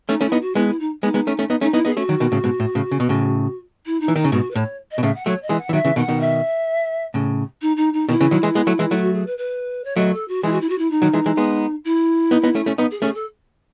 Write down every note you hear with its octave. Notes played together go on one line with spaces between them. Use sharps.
A3 C#4 D#4
A3 C#4
E4
B3 D#4
F#4
G#3 B3 E4
E4
D#4
G#3 B3 D#4
G#3 B3
A3 C#4
A3 C#4
B3 D#4
A3 C#4 D#4
B3 D#4 E4
B3 D#4 G#4
A3 C#4 F#4
D#3 F#3
B2 D#3
A2 C#3
G#2 B2
A2
A2 C#3
C#3
B2
A2 C#3
E4
D#4
E3
D#3 D#4
C#3
G#2 B2 F#4
B4
A2 C#5
D#5
B2
A2 C#3 E5
F#5
F#3 A3 C#5
D#5
E3 G#3
F#5
E3
D#3 F#3 E5
C#3 E3
B2 D#3 F#5
B2 D#3
E5
A2 C#3
D#4
D#4
D#4
B2 D#3 E4
C#3 E3
D#3 F#3
E3 G#3
G#3 B3
F#3 A3
E3 G#3
F#3 A3
F#4
G#4
B4
B4
C#5
F#3 A3 D#5
A4
F#4
E3 G#3 E4
F#4
E4
F#4
E4
D#4
D#3 F#3
E3 G#3
E3 G#3
G#3 B3
E4
B3 D#4
B3 D#4
A3 C#4
A3 C#4
B3 D#4
G#4
A3 C#4 G#4
A4